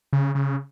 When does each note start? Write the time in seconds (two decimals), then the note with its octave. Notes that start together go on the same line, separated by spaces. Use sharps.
0.13 C#3
0.35 C#3